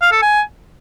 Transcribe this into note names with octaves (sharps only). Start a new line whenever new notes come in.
F5
A4
G#5